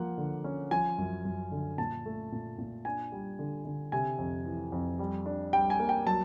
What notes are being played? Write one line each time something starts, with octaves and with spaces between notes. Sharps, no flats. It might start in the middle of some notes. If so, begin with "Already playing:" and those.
Already playing: F3 A#3 F#5
D3
C#4
F3 G#5
F#2
F#2
D3
A#2 A5
A3
A#2
A#2
D4 G#5
G3
D3
D3
C3 G#5
F2
E3
F2
G3
D4
G3 G5
G#5
A#3
G5
F#3 A5